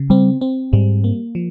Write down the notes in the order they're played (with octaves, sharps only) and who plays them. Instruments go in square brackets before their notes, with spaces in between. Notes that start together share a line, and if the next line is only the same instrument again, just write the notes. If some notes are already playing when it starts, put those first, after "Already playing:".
Already playing: [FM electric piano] C#3
[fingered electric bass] G3 [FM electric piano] C4
[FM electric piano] C4
[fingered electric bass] G#2 [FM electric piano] G3
[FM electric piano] A#3
F3